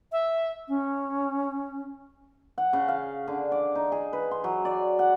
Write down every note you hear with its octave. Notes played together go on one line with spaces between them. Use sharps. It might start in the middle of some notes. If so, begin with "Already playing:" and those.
E5
C#4
F#5
C#3
F5
D3
D5
D#4
G#4
B4
C6
F#3
D5
F#5